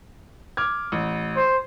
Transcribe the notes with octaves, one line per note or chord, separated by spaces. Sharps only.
D6 F6 G#6
A1
C5